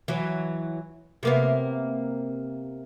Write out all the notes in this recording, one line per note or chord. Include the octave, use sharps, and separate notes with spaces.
E3 F#3
C3 A#3 B3